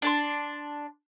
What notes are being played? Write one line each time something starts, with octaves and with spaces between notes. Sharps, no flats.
D4 A5 C6